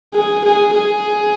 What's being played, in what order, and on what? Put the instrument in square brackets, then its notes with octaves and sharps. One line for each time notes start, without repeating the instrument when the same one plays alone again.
[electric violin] G#4
G#4
G#4